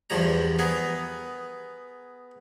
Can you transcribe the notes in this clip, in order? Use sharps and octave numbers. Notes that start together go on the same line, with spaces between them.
E2 G2 F3 G3 A#5
B3 G#4 A#4